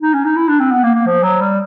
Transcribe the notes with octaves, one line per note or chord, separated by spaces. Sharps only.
D#4
C#4
D#4
E4
D4
C4
B3
A#3
A#3
F3
F#3
G3